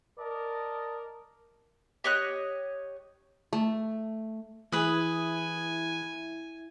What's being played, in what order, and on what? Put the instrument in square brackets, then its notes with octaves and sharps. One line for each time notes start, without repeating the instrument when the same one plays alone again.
[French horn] A#4 [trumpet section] D5 D#5 A5
[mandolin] G4 C#5 D#5 F#6
[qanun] A3
[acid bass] E3 [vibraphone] E4 E5 [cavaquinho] G#4 B4 D#6 [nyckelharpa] G#5